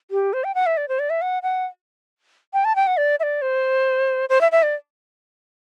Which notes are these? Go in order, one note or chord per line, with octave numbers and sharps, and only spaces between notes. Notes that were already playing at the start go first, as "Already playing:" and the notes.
G4
C5
G5
F#5
E5
D5
C5
D5
E5
F#5
F#5
G5
A5
G5
F#5
D5
E5
D5
C5
C5
E5
E5
D5